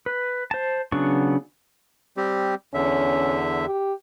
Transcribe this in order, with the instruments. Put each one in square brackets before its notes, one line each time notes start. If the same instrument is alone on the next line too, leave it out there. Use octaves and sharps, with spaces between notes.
[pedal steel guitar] B4
C5 A5
C#3 F#3 B3 D4 C#6
[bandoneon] G3 C4 G4
[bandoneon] E2 D3 E5 [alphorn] C#4
[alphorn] G4